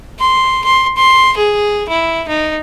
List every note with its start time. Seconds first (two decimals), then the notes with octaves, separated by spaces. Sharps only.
0.19 C6
0.64 C6
0.97 C6
1.37 G#4
1.89 E4
2.28 D#4